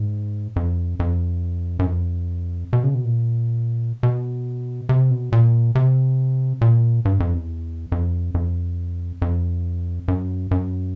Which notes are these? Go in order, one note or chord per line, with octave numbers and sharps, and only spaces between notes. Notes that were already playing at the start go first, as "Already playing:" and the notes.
Already playing: G#2
F2
F2
F#2
F2
B2
C#3
B2
A#2
B2
C3
B2
A#2
C3
A#2
G2
F2
E2
F2
F2
F2
F#2
F#2